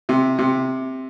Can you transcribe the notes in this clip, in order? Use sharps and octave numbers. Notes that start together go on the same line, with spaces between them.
C3
C3